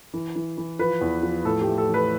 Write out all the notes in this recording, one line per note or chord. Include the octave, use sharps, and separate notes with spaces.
E3
E3
E3
F3 B4
E2
F3
A2 A4
G4
A3
A4
E3
B4